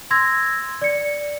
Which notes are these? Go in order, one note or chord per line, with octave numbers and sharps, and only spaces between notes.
C6 E6 G#6 A#6
D5 C#7